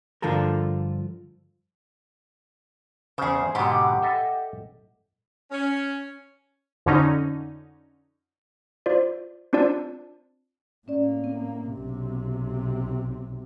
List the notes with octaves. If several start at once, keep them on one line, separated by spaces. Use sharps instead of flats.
G2 D3 F3 F4 A4 A#4
E2 C#3 G#4 C5
G#2 B2 D3 G4 F#5
A4 D#5 E5
C#4
F2 D3 C#4 D#4
F4 C5 D5
C4 D4 F4 D5 A5
A2 A#3 C#4 D5
C4
B1 C3